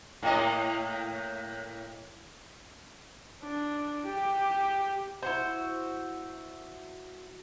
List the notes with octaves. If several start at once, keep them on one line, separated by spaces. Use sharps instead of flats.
A2 A#3 D#5
D4
G4
E4 F#4 C5